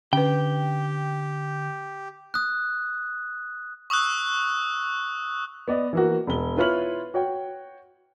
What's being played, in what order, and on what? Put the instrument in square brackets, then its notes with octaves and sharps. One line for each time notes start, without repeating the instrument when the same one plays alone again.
[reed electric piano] D3 [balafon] C#4 B4 [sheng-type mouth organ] G4 [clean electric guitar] G5
[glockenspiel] D#6 F#6
[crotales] C#6 D#6 E6 F#6
[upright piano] B3 D5 D#5
E3 A#3 F#4
E1 G7
E4 F4 B4 C#5 F6 F#7
F#4 C#5 G5